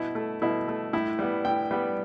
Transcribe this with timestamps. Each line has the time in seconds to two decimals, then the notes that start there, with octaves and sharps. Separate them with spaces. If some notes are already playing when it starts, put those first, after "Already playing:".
Already playing: B2 E4
0.15 A3
0.42 B2 E4
0.68 A3
0.93 A2 E4
1.19 G3 B3
1.45 A2 G5
1.71 G3 B3